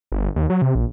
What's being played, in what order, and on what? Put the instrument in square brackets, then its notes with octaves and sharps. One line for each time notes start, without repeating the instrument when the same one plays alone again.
[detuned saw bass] G1
D#2
F#3
C3
A#1